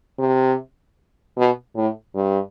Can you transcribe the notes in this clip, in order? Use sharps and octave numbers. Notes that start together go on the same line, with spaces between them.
C3
B2
A2
G2